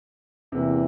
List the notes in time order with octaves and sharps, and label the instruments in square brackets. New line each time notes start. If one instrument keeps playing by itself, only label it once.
[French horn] E2 [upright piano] C3 A#3